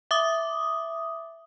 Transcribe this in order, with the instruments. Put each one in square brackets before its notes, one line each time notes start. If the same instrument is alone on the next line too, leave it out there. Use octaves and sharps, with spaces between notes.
[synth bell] E5 D6 D#6